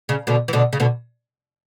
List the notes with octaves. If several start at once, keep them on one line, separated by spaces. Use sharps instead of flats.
C#3
B2 D3
E3
B2 D3
C#3
B2 D3